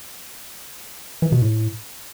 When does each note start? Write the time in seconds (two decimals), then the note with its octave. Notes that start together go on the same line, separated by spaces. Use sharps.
1.22 E3
1.32 B2
1.42 A2